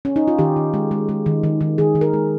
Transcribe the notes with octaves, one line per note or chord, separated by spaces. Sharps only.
C#4
D#4
F4
D#3 G4
D#3
G#3
G#3
G#3
D#3
D#3
D#3
D#3 G#4
D#3
A#4
G#3